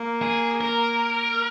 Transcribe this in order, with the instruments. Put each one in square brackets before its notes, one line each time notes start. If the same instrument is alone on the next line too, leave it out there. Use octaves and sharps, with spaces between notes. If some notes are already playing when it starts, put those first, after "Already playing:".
Already playing: [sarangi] A#3
[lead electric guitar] G#4
A#4